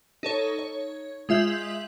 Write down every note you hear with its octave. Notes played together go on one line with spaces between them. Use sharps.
D#4 A4 C#5
C#5
G#3 F4 E5 G6 F#7